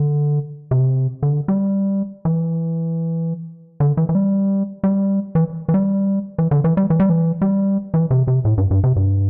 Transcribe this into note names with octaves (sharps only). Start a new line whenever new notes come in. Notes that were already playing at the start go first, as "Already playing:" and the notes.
Already playing: D3
C3
D3
G3
E3
D3
E3
E3
G3
G3
E3
E3
G3
E3
D3
E3
G3
E3
G3
E3
G3
E3
C3
C3
A2
G2
G2
C3
G2